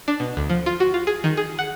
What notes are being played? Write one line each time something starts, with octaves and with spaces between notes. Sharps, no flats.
D4
B2
D2
F3
F4
F#4
F4
G#4
D#3
G#4
F#5